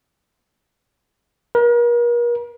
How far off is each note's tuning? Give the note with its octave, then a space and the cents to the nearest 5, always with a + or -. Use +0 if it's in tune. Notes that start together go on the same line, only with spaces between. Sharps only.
A#4 +40